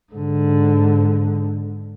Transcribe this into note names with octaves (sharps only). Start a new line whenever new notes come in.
G#2 D3